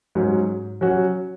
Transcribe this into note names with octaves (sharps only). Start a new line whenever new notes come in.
G#2 F#3 C#4 F#4
F#3 C#4 F#4